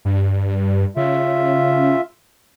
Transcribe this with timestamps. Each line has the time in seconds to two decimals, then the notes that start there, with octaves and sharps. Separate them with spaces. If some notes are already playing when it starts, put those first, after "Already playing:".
0.05 G2
0.96 C#3 F4 E5